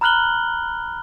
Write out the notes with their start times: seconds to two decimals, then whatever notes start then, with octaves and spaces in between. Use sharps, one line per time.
0.01 A#5 B5 F6 F#6 F#7 G7